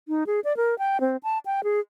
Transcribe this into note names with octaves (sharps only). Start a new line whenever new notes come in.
D#4
G#4
D5
A#4
G5
C4
A5
G5
G#4